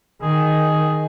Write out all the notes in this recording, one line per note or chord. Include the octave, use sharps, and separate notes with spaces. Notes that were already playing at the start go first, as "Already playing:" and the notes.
D#3 G#4